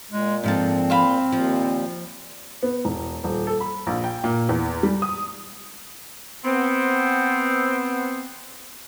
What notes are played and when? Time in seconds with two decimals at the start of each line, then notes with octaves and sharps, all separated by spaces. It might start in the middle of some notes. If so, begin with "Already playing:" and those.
0.11 A#2 G#3
0.44 G#2 F3 C4 A4
0.90 C5 F5 B5
1.32 D#2 A#2 F3
2.63 B3
2.85 E1
3.24 D#1
3.47 A4
3.60 B5
3.87 A#1
4.04 G5
4.24 A#2
4.49 E2
4.83 G3
5.02 D#6
6.45 B3 C4